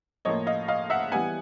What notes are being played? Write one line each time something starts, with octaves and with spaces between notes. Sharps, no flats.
A2 F3 A#3 C#5 D#5
D#5 F5
D#5 F5
E5 F#5
E3 G3 B3 F#5 G#5